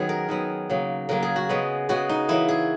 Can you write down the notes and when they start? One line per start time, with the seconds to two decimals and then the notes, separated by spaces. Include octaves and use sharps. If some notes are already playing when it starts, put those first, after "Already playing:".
Already playing: D#3 F#3 B3 C#4 F#4 G#4
0.09 A#4
0.29 D#3 F#3 B3
0.69 C#3 F#3 A#3
1.09 C#3 F#3 A#3 A#4
1.22 G#4
1.36 F#4
1.49 C#3 G#3 B3
1.89 C#3 G#3 B3 F#4
2.09 D#4
2.29 E3 A#3 C#4 E4
2.48 G#4